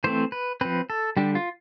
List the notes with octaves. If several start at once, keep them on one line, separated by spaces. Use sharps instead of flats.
E3 A3 C4 C5
B4
F3 C4 B4
A4
D3 G3 D4 G4
F4